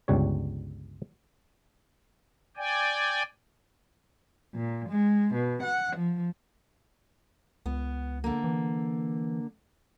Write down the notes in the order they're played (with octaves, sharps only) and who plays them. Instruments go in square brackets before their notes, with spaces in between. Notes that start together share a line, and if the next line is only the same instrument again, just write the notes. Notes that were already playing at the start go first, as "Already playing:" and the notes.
[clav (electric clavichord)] G1 C#2 G3 C#5
[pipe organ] D5 G5 G#5
[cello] A#2
G#3
B2
F#5
F3
[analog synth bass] C#2 [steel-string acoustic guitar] B3
[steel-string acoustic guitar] D3 A#3
[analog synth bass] E3